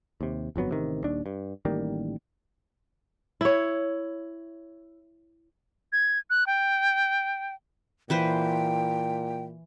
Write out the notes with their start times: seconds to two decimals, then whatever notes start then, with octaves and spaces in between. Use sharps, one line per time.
0.21 D#2 C3
0.56 G1 F2 F#3 B3
0.69 A1 C3 D#3
1.04 D#1 D#2 D4
1.26 G2
1.65 A1 D#3 G3 A#3
3.41 E4 C#5
5.92 G#6
6.30 F#6
6.46 G5
8.10 A#2 E3 B4 C5 G5